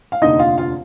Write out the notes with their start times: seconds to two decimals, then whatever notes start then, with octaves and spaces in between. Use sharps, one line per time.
0.12 F5
0.22 F1 D#2 D3 D#4 D#5
0.39 F4 F5
0.58 F4 F5